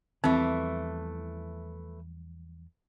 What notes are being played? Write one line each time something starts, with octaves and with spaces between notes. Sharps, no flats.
E2 E3 F3 G3 A3 C4